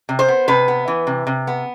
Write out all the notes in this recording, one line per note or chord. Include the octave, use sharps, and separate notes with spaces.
C3
C5
B3
C3 B4
B3
E3
C3
C3
B3